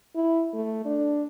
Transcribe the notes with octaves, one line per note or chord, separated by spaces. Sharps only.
E4
A3
D4